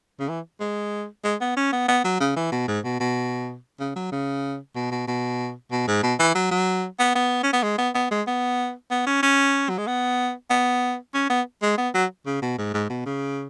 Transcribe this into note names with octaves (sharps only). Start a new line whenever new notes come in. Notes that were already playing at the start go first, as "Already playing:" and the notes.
C#3
E3
G#3
G#3
B3
C#4
B3
B3
F#3
C#3
E3
B2
G#2
B2
B2
C#3
F#3
C#3
B2
B2
B2
B2
G#2
B2
E3
F#3
F#3
B3
B3
C#4
B3
G#3
B3
B3
G#3
B3
B3
C#4
C#4
F#3
G#3
B3
B3
C#4
B3
G#3
B3
F#3
C#3
B2
G#2
G#2
B2
C#3